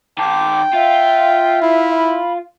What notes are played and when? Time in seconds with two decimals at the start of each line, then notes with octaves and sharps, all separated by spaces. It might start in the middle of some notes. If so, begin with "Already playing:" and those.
0.18 D#3 G5 A5 D6
0.74 F4 E5
1.62 E4
1.94 B5